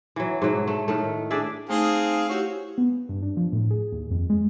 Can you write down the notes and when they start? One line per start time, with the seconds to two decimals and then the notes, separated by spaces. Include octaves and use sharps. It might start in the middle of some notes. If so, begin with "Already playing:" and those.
0.16 E3 F#3
0.42 G#2 B2 F#3
0.67 A3
0.88 A2 D#3 A3
1.31 D4 G#4 D5 E5
1.69 A3 C4 D#4 G#4 F5
2.29 E4 F#4 G4 C#5
2.78 B3
3.09 G2
3.22 D4
3.37 F3
3.52 A2
3.71 G#4
3.92 D#2
4.11 F2
4.30 G#3